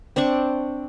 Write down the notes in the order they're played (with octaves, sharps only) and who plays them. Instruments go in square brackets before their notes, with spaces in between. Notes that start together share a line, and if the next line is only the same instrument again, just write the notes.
[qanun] C4 D4 D5 C#6